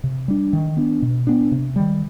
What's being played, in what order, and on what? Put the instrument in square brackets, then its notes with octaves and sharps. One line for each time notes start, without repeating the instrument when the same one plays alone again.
[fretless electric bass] C3
G3 D4
D#3
B3 D4
B2
B3 D4
C3
D#3 G3